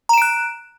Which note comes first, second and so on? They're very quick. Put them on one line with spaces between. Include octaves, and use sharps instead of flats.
A#5 E7 D7 F#6